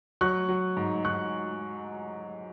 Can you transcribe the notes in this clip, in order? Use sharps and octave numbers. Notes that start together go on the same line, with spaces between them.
F#3 C#6 F#6
F#3
G#2
G#2 C#6 F#6